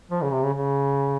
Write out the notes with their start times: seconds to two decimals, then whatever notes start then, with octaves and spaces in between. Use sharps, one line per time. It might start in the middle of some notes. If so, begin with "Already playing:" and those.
0.11 F3
0.22 C#3
0.32 C3
0.43 C#3
0.53 C#3